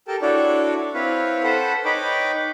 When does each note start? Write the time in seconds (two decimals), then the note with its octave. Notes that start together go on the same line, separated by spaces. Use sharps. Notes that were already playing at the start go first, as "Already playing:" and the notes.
0.08 G4 A4 A#4 G5 A5
0.22 D4 E4 F#4 A4 C#5 D5
0.94 C4 E4 B4 C#5 F5
1.43 A4 B4 C5 F#5
1.85 D#4 B4 C#5 G5 B5 D6